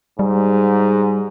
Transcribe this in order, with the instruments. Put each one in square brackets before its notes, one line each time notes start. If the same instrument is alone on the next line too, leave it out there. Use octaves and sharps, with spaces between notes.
[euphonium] G#2 [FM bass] G3